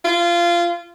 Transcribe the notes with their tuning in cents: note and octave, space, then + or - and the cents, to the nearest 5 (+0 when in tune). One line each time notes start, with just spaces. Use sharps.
F4 -20